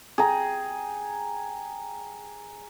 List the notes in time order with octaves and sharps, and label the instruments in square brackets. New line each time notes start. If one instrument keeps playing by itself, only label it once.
[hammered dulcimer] G#4 G5 A#5